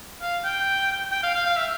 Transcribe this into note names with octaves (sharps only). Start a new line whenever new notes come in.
F5
G5
G5
F5
F5
F5
E5